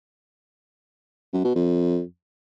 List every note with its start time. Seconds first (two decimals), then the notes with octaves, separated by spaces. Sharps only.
1.33 F#2
1.44 B2
1.55 F2